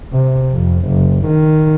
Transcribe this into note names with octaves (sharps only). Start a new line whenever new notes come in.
C3
F2
F#1
D#3